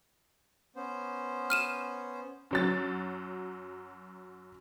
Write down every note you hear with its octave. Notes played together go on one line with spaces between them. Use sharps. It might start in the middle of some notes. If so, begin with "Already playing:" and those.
B3 C#4 C5
F6 D#7 E7
F#2 F#3 A6